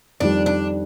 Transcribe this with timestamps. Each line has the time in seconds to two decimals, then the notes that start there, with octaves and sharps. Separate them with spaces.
0.20 F2 D#3 G3 D4
0.46 D4